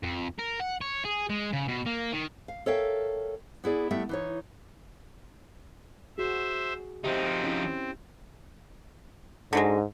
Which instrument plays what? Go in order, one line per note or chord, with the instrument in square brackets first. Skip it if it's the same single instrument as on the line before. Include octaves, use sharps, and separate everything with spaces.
[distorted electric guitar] F2
A#4
F#5
C#5
G#4
G#3
C#3
B2
A#3
D#3
[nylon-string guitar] F5
A4 A#4 C#5 E5 F5 G5
B3 E4 G#4 D5
G3 A3 B3 E5 G5
E3 D#4 C#5
[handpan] F#4 G#4 [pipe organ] C5 E5
[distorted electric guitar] F3 D#4 [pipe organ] C4 [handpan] G4 E5
[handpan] C#4 E4
[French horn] G#2 [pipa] D3 F#3 G#3